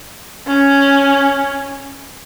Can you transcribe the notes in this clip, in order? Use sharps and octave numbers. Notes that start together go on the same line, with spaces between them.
C#4